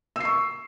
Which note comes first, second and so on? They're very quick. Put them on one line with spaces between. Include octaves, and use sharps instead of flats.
E6 C7 C#6